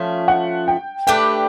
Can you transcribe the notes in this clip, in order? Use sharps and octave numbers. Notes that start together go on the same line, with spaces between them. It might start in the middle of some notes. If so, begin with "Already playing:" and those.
Already playing: F3 A3 C#4
F#5
G5
A3 D4 G4 B4 G5